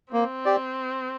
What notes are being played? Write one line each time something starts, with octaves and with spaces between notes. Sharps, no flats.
A#3 C4
G4 D5